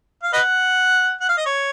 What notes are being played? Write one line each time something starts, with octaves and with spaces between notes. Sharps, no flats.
F5
B4 D#5 F#5
F#5
F5
D#5
C#5